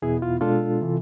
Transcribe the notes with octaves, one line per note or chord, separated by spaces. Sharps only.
E2 B2 B3 E4 G#4
F4
B2 G#3 D4 F4 A4
C3 E3